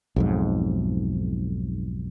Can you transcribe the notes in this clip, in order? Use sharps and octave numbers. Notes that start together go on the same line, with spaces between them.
B1 F2 G#2